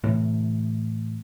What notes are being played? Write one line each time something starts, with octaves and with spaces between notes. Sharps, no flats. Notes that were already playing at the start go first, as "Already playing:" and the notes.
A2 C3 E3